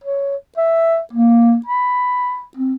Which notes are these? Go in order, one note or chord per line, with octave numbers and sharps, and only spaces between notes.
C#5
E5
A#3
B5
C4